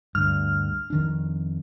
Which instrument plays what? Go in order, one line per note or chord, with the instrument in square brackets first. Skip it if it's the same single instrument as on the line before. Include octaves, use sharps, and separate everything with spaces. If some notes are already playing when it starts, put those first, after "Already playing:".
[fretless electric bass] D2 G2 [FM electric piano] F6
[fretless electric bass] F2 D#3 D4